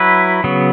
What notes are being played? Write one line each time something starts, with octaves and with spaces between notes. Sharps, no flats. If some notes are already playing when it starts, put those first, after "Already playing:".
Already playing: F#3 E4 B4
C#3 F#3 B3